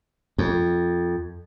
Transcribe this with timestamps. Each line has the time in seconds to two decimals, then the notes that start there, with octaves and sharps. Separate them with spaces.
0.38 F2